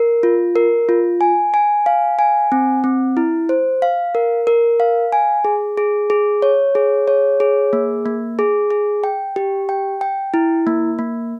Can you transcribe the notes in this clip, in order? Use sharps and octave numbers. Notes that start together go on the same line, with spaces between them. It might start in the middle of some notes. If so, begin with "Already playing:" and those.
Already playing: A#4
F4
A#4
F4
G#5
G#5
F5
G#5
C4
C4
E4
C5
F5
A#4
A#4
F5
G#5
G#4
G#4
G#4
C#5
G#4
C#5
G#4
A#3
A#3
G#4
G#4
G5
G4
G5
G5
E4
A#3
A#3